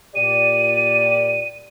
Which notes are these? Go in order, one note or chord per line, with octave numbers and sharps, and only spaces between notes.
A#2 G4 D5 D#7